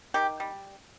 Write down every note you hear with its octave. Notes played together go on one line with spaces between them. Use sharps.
D#3 G4
G3